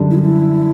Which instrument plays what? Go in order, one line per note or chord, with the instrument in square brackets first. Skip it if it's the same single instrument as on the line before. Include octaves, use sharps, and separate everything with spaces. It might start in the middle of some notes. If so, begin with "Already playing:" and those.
Already playing: [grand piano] F#2 D3 G3
[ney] E4
F#4
E4